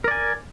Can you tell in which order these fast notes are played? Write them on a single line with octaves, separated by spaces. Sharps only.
A#4 D5 G#5